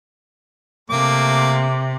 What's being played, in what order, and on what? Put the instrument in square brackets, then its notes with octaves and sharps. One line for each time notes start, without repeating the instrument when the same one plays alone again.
[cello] C3 [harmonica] A3 A#3 D6